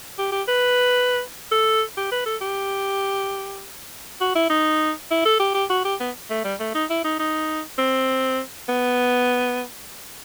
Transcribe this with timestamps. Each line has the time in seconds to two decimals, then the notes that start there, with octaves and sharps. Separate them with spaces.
0.18 G4
0.32 G4
0.48 B4
1.51 A4
1.97 G4
2.12 B4
2.26 A4
2.41 G4
4.21 F#4
4.35 E4
4.50 D#4
5.11 E4
5.25 A4
5.39 G4
5.55 G4
5.70 F#4
5.85 G4
6.00 B3
6.30 A3
6.44 G3
6.60 A3
6.74 D#4
6.90 E4
7.04 D#4
7.19 D#4
7.78 C4
8.68 B3